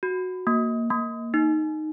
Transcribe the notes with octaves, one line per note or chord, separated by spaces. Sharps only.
F#4
A#3
A#3
D#4